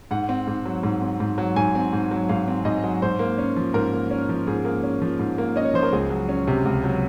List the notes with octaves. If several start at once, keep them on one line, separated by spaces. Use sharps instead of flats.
G#2 F#5
C4
G#2
F#3
G#2
C4
G#2
F#3
G#2 G#5
C4
G#2
F#3
G#2 F5
C4
G#2 D#5
F#3
G#2 C5
A#3
C#4
F3
G#2 A#4
A#3
C#4
F3
G#2 G#4
A#3
C#4
F3
G#2
A#3
C#4 D#5
C#5
F3 C5
A#4
C#2 G#4
F#3
C#4
C3
C#2
F#3